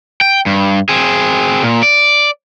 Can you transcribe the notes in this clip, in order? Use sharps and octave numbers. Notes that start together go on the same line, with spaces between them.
G5
G2
C4 G#4
A#2
D5